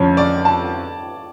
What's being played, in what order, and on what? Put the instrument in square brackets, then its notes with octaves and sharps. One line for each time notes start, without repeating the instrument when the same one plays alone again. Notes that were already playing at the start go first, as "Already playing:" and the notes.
Already playing: [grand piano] F2 D3 F3 A3 C#4 [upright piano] C#5
[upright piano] D5
A5